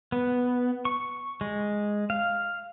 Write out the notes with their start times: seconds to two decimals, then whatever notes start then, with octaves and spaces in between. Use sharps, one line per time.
0.12 B3
0.85 C#6
1.41 G#3
2.10 F5